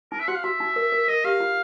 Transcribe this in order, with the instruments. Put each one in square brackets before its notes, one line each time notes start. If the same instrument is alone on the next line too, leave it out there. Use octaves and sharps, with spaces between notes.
[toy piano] D#4 [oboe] A#4
[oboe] E5
[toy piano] F#4 [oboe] F#5
[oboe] F5
[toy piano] F#4 [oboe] E5
[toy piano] D#4
A#4
A#4
[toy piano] A#4 [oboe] D#5
[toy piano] G4 [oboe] F5
[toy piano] F4